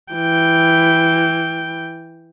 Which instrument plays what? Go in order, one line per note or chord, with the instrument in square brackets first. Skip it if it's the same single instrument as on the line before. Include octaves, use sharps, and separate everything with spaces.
[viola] E3 G5